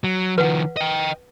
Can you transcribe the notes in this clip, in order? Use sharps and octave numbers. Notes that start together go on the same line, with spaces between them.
F#3
D#3 F3 B4 F#5
D#5 G5